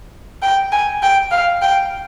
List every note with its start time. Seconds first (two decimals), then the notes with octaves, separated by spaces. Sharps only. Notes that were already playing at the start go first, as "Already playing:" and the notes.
0.42 G5
0.72 G#5
1.02 G5
1.32 F5
1.62 G5